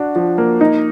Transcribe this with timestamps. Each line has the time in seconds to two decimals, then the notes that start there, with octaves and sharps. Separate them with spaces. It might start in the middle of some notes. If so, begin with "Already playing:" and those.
Already playing: D4 F#4
0.16 F3
0.38 A#3
0.61 D#4